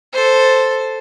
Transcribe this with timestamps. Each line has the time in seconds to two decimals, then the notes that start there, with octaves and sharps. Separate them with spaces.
0.13 A4 C5